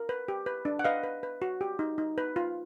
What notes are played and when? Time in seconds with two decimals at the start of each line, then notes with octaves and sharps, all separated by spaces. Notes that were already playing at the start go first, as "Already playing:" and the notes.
Already playing: A#4
0.09 B4
0.28 G4
0.46 B4
0.65 D4
0.79 F#5
0.85 B4 D#5 F5
1.03 B4
1.23 B4
1.42 F#4
1.61 G4
1.79 D#4
1.98 D#4
2.18 B4
2.36 F4